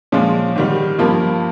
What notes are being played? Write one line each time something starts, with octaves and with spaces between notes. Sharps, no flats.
A#2 F3 G#3 C#4 F4
G#2 D#3 G3
G2 F3 A#3 F4